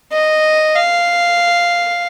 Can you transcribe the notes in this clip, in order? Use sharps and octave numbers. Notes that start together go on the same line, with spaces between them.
D#5
F5